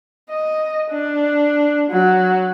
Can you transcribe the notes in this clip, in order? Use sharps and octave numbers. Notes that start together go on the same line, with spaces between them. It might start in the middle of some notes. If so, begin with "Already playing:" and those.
D#5
D4
F#3